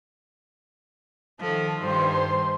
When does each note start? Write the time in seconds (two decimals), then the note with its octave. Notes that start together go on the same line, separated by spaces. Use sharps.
1.40 D#3 F3 A4
1.80 G2 D#3 C5 C6